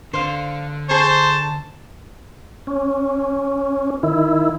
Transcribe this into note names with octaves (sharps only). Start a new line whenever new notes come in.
D3 C5 F5
G#4 C5 A5 A#5 C#6
C#4
D#3 E4